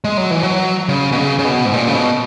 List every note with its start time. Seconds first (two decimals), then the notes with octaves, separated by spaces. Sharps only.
0.04 G#3
0.17 F#3
0.31 E3
0.43 F#3
0.89 C#3
1.12 B2
1.18 C#3
1.39 C#3
1.45 B2
1.65 G#2
1.74 A#2
1.87 C#3
1.95 B2